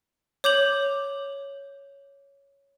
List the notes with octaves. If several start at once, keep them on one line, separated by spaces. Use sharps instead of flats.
C#5 D6 G6 F7 F#7